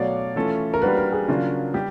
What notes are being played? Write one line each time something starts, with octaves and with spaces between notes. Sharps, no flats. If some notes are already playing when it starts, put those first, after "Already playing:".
Already playing: B2 F#3 A3 C#5 D5 F5
E3 A3 C#4 F4 A4
A#4
G3 A#3 D4 F#4 B4
A#4
G#4
C#3 F#3 A#3 D4 F4
G3 G4